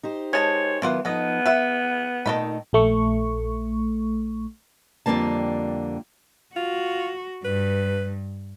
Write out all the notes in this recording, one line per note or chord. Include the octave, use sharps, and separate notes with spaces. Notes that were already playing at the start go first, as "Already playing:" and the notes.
D#4 G4 C5
G#3 C#5 A5
D#3 E3 F#3 B3 F4 F#5
F3 B3 D#4 A4 D#5
B4 E5 F#5
A#2 D#3 A3 D#4 A4 B5
A#1 A3 C#6
F2 D3 E3 G3 A#3 A5
F4 F#4
G2 B4